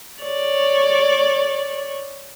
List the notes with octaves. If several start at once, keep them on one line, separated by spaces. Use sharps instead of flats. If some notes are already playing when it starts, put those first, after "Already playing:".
C#5 D5